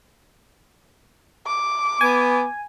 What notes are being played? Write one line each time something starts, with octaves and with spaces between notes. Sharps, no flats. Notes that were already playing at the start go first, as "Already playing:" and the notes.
D6
B3 G#5